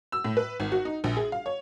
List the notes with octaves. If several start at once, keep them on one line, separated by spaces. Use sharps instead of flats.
E6
A2
B4
G#1
F#4
D#4
A#1
G#4
F5
C#5